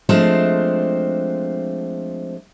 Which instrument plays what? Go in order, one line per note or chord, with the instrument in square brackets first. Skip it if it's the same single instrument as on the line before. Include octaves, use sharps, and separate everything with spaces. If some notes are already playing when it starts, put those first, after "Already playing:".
[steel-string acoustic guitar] F3 G#3 A3 C4 D4 C5